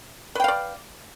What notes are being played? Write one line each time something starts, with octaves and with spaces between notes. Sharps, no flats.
B4 D5 F5 G5